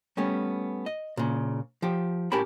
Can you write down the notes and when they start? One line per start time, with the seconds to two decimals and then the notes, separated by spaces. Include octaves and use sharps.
0.17 G3 A3 B3 C#4
0.86 D#5
1.17 A#2 C#3
1.82 F3 G4
2.32 A2 C#4 G4 A#4 A5 B5